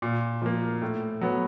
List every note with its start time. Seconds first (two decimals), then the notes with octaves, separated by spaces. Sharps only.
0.02 A#2
0.42 F3 A#3
0.81 A2
1.21 F#3 B3